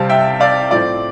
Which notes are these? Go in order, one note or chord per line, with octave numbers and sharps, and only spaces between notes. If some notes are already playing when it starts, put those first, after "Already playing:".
Already playing: C3 G3 C4 F5 A5
E5 G5
D5 F5
A2 F3 C4 D5